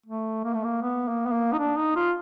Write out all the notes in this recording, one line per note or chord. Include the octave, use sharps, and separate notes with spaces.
A3
A#3
A3
A#3
B3
A#3
B3
A#3
D#4
D4
D#4
F4